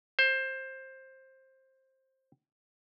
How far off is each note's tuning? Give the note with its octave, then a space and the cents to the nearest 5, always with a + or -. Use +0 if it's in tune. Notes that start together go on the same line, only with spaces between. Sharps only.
C5 +15